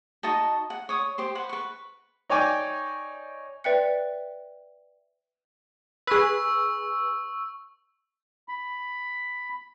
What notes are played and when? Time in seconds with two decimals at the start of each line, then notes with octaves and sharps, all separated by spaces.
0.23 D#4 F#4 D#5 A5
0.70 F#5
0.89 C#5 C#6 D#6
1.18 G4 C5 C6
1.35 B4 C5 F#5
1.49 B4 C#6
2.30 D#4 C#5 D5 G5 G#5 D6
3.64 B4 D5 E5 G5 F#6 C#7
6.07 G#4 B4 C#6 E6
8.49 B5